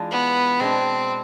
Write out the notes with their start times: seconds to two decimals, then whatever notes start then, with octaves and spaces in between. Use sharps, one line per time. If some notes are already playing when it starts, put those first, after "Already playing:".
Already playing: E3 G#3 D4 F4
0.11 B3
0.60 B2 G#3 C4 D4